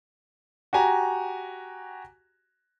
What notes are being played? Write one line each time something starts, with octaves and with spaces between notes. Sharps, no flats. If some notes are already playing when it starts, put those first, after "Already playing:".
F#4 G4 G#5 A#5